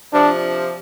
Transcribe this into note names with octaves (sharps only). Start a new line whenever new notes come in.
C3 F3 D4